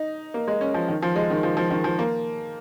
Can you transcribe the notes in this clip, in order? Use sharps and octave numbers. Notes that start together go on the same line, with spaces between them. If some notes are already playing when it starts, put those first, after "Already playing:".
Already playing: D#4
A#3
G#3
C#4
F3
D#3
F3
G#3
D#3
F3
F3
D#3
F3
A#3